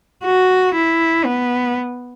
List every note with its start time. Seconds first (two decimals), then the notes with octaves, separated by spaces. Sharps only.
0.25 F#4
0.75 E4
1.25 B3